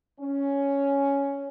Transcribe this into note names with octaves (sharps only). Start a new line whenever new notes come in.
C#4